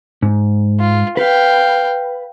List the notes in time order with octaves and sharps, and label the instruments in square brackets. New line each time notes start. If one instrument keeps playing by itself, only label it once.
[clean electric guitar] G#2
[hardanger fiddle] F4
[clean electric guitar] B4 [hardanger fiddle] F5 G5